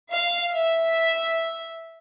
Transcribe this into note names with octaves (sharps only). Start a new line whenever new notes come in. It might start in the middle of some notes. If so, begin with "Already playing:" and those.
F5
E5